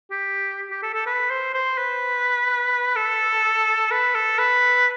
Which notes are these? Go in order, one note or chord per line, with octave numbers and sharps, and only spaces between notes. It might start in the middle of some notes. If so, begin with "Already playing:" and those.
G4
G4
A4
A4
B4
C5
C5
B4
A4
B4
A4
B4